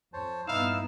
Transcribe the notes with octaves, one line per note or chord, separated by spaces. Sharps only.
F2 C5 C#5 A5
G2 A#2 B3 D#4 E4 F5 E6